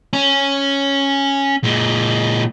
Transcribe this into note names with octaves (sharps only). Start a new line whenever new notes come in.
C#4
A#2 G#3